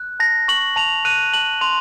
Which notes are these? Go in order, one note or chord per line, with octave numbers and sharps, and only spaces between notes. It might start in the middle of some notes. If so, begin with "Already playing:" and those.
Already playing: F#6
A5 A#6
C#6 F#7
A5 F7
F#6 D#7
A5 F#7
C6 F7